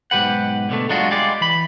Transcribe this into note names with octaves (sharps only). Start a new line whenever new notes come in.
B1 G#2 C#3 G4 B4 F#5
B2 D3 A3
F#3 G#3 D4 F4 F#4
G3 G#3 F4 D5
E3 B5